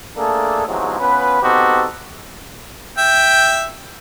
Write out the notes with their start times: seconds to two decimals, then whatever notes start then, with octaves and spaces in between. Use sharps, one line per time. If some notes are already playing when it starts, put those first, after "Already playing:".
0.17 A3 A#3 D4 G#4 A4
0.67 E2 G#2 C3 F3 F#3
1.00 B3 C#4 F4 B4
1.42 B3 C4 D#4 F#4 G4 A4
2.98 E5 G5